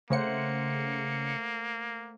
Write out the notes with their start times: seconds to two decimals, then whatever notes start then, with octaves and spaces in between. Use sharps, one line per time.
0.10 C#3 A3 A#3 C5 F#5 C#7